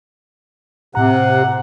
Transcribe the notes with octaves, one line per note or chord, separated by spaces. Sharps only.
A2 C3 F#5 A#5